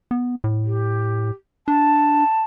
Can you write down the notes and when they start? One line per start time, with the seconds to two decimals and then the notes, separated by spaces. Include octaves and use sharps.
0.11 B3
0.44 A2
0.65 G4
1.68 D4 A5